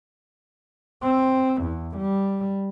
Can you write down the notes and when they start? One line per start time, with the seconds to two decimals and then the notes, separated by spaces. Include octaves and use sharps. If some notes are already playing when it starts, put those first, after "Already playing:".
1.02 C4
1.62 E2
1.97 G3